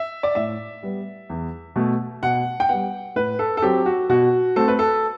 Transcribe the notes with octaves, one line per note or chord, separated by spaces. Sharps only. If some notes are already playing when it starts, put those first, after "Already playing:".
Already playing: E5
D5
A2 E5
G3 B3
E2
B2 A3
B2 F#5
G5
G3 B3 F#5
A2 B4
A4
A4
F#3 C4 G4
F#4
B2 F#4
A3 C4 A4
B4
A4